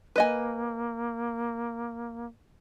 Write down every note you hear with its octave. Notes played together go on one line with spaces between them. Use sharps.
A#3 B4 D#5 G#5